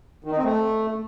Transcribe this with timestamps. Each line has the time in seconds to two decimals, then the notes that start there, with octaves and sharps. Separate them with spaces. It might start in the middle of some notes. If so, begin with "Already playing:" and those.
0.24 D#3
0.31 D#4
0.38 C4
0.45 A3